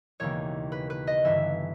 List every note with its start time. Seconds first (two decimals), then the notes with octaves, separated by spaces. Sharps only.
0.20 E1 D#2 C#3 E3 C#5
0.72 B4
0.90 B4
1.07 D#5
1.24 G1 G2 E3 E5